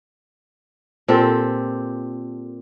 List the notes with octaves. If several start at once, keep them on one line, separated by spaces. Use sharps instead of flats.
A#2 C4 G4 A4